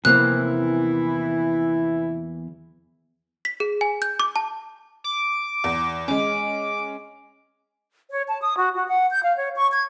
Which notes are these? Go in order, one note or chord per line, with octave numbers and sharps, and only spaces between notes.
E2 C3 E3 F3 A#3 C4 E4 F#6
B6
G#4
G#5
G6
D6
A5
D6
E2
G#3 C#4 D6
C#5
A5
D#6
F#4
F#4
F#5
G6
F5
C#5
C#6
G#6